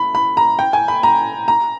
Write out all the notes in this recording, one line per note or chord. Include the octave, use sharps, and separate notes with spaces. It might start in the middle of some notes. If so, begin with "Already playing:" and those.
Already playing: B5
B5
A#5
G5
G#5
B5
A#5
A#5